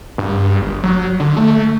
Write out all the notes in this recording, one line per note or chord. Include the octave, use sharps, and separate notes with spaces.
G2
G2
G1
F#3
D3
A3